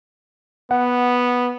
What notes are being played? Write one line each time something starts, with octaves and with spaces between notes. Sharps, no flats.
B3 F#5